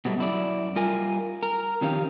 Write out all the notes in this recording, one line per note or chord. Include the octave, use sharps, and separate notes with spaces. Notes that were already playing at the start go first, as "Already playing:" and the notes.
B2 F#3 G3 A3
F#2 E4 D5
G3 F4 A#4 G#5
A#4
F2 D#3 C#4 G4 F5